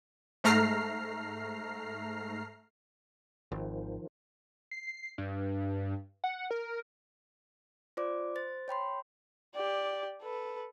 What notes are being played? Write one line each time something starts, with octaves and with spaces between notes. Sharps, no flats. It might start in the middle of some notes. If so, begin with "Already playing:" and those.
G#2 A3 A#5 F6 C7
G#1 D#3 F3
C7
G2
F#5
A#4
F4 C5 D5 D6
C5 A6
C#5 G5 B5 C6
G4 D5
A4 B4